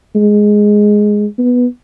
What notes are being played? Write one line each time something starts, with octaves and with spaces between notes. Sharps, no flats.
G#3
B3